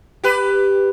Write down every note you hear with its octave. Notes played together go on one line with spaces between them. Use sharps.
G4 B4